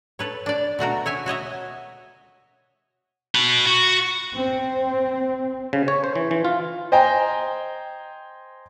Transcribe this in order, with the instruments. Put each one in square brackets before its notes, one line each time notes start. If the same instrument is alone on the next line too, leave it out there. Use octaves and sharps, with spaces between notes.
[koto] A4 B4 C#5
D4 D5
B2 A3 F#4 A#4
C#5 E5 G#5
F#4 C#5 D#5 E5
[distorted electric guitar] F#4 B5
F#4
[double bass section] C4
[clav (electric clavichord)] C#3
C#5
C5
E3
E3
F4
[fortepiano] C5 D#5 G5 G#5 A#5